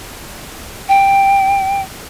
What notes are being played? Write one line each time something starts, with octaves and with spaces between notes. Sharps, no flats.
G5